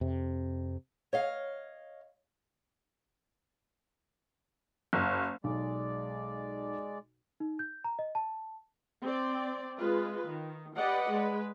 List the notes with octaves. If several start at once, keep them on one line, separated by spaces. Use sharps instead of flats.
F2 C3
C#5 D#5 F5
F#1
B1 G#3 D5
D#4
G6
A#5
D#5
A5
C4 D5
G#3 F4 B4
D#3
G4 B4 D5 D#5 F#5
G#3 B4